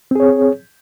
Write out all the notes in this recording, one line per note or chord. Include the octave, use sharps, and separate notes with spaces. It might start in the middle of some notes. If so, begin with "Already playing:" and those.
C4 G#4 C#5